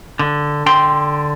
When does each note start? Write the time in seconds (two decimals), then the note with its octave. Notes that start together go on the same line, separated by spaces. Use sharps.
0.19 D3
0.66 D3 G5 C6